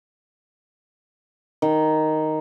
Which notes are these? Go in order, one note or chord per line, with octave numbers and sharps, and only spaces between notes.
D#3